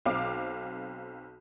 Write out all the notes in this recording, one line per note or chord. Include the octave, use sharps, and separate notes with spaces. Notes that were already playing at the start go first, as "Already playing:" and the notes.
B1 C4 F5 D6